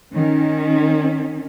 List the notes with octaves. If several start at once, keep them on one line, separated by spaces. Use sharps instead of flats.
D#3 C#4